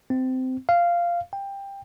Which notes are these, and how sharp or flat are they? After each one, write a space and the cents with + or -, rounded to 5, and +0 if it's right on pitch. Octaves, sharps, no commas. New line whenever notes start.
C4 -20
F5 -10
G5 +15